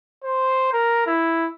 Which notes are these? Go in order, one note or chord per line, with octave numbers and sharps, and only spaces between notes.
C5
A#4
E4